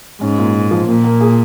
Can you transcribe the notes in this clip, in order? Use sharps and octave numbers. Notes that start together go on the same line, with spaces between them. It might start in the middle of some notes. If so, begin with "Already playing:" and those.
G#2 C#4
A#2
A#2
F3
A#2 A#3
A#3
G#4